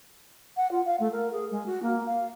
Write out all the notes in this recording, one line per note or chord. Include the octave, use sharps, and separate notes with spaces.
F#5
F4
F5
A3
A#4
G#4
G#3
F#4
A#3
F5